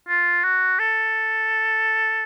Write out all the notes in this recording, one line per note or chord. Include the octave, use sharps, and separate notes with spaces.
F4
F#4
A4